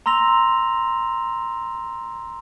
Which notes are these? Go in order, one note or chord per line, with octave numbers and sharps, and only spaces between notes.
A#5 C6 E6 A#6 F7